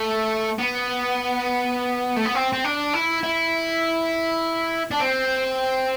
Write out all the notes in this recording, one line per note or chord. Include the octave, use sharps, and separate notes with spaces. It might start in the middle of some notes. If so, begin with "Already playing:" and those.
Already playing: A3
B3
A3
B3
C4
C4
D4
E4
E4
D4
C4